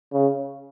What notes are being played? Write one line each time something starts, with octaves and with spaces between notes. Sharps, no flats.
C#3